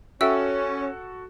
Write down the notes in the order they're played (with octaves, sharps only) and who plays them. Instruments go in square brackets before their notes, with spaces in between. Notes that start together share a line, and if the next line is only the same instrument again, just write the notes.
[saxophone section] C#4 [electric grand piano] F#4 A4 [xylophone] E5 G5 E6